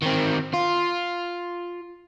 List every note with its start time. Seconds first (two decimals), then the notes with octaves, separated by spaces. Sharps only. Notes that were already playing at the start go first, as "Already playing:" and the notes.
0.03 D#3 C4
0.54 F4